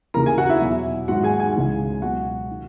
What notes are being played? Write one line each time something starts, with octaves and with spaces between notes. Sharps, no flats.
D#2 C#3 E3 A#4 A#5
G#4 G#5
F#4 F#5
E4 E5
E2 B2 F#3
G#2 D#3 F#3 F#4 F#5
G#4 G#5
G#4 G#5
C#2 C#3 E3
C#2 B2 F#3 F#4 F#5
D#3